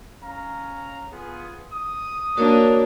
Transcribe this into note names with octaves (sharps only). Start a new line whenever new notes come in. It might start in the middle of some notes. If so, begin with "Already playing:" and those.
C#4 F5 A#5
B3 F4 G#4
D#6
A#3 D4 F#4 A#4 C#5